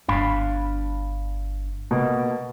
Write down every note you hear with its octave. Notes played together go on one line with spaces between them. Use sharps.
G1 D4 F5 B5
B2 A#3